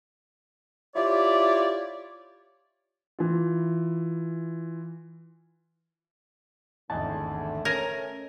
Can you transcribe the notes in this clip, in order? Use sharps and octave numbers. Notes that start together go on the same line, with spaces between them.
E4 F4 G4 C#5 D5
E3 F4
G#1 E2 D3 A3 D#5 A5
A3 C#4 A#4 G#6 D#7